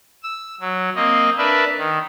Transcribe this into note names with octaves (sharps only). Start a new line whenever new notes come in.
E6
F#3
A#3 C4 D#5
D4 A#4 B4 D5 E5
D#3